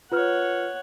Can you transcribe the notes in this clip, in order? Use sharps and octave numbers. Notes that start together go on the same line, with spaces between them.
F4 B4 C#5 F#5 F6